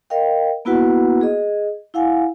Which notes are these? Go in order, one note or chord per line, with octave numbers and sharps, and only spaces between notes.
A#4 D#5 F5 G5
A#3 B3 E4 F#4 B4 F#5
G#4 D#5
E4 F5 F#5 G#5